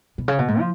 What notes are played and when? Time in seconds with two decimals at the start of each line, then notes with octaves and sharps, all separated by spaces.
0.18 B2
0.28 C#3
0.39 B2
0.48 G#2
0.59 F3